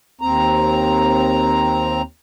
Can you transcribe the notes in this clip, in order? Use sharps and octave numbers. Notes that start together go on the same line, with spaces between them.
D#2 C4 A#5